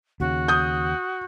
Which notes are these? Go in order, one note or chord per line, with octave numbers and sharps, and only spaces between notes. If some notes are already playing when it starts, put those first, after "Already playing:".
D#2 C#3 F#4
D#6 G6